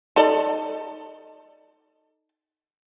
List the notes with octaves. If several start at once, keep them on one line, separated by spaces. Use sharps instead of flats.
D#4 A4 D5